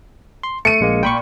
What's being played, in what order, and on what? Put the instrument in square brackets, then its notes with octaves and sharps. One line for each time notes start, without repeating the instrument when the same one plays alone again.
[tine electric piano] C6
[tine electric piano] A3 [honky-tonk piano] C#7 D#7
[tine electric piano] A#1 G#3 A#3
[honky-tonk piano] A#2 [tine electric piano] G5 B5 C#6